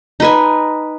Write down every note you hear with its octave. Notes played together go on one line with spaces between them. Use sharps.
D#4 B4 G#5